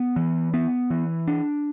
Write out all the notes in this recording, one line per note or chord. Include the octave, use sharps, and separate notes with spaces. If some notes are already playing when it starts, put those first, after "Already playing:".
Already playing: B3
E3
B3
E3
D4